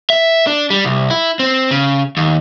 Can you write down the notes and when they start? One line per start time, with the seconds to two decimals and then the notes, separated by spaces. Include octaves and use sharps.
0.10 E5
0.47 D4
0.70 G3
0.85 C2
1.10 E4
1.39 C4
1.71 C#3
2.17 D#2